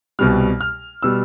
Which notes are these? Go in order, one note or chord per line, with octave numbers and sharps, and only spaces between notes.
C2 B2 G3 F6
F6
B2 G3 E6